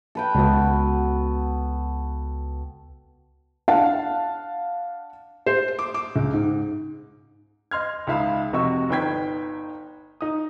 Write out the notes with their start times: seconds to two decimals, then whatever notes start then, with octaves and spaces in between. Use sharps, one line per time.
0.15 A4 B4 G5
0.35 C#2 B3 F#4
3.68 D4 F5 F#5 A5
5.46 C5
5.79 D6
5.94 D6
6.16 C#2
6.33 G#2
7.71 D#5 C6 F6 G#6
8.07 C#2 G#3 D#4 E5 F5 B5
8.53 F1 C3 F#4 D#5 C#6 E6
8.90 G1 D#4 B4 G5 G#6 B6
10.21 D#4 D#6